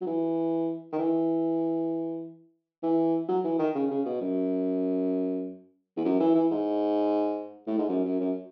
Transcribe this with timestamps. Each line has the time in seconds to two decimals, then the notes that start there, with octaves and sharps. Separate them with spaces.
0.01 F#3
0.06 E3
0.92 D#3
0.98 E3
2.83 E3
3.28 F#3
3.44 E3
3.59 D#3
3.75 C#3
3.90 C#3
4.05 B2
4.21 F#2
5.97 E2
6.05 F#2
6.20 E3
6.35 E3
6.51 G#2
7.67 A2
7.78 G#2
7.89 F#2
8.04 F#2
8.20 F#2